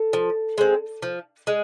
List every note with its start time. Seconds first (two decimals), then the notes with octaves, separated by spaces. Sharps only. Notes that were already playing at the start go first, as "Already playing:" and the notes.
Already playing: A4
0.13 F3
0.58 G#3 C4
1.03 F3
1.47 G#3